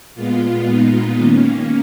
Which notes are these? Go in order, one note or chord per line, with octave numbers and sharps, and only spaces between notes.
A#2 G#3 B3 F4
D#4
D#3 A#3 C#4